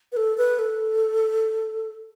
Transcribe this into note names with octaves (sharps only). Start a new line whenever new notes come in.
B4
A4
B4
A4